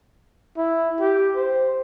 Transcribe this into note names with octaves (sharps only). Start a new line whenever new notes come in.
E4
G4
C5